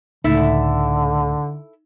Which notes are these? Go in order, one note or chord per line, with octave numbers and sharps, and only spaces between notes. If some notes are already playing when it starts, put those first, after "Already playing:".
C#2 A2 D3 D#4 E4 A4 E5